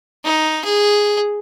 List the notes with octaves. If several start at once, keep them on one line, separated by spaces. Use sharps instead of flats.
D#4
G#4